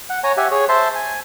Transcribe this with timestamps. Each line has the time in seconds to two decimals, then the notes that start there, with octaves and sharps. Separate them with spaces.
0.10 F#5
0.24 C#5 G#5 A#5
0.37 G4 E5 F#5 G#5
0.51 G#4 C#5
0.69 C5 E5 A5 C6
0.95 G#5